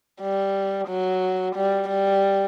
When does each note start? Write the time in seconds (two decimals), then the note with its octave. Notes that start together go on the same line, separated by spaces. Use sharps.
0.21 G3
0.88 F#3
1.56 G3
1.89 G3